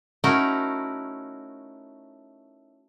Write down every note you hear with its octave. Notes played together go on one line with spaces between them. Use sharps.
A3 C#4 D#4 E4 F#4 A#4